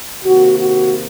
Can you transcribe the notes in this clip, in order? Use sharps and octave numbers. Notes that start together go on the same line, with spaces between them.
C3 D#3 A#3 F#4
F#4